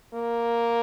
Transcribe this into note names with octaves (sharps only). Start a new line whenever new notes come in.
A#3